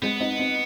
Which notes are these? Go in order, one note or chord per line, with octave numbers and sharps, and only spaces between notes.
G#3 B3 C4
C4 D#4
C4 D#4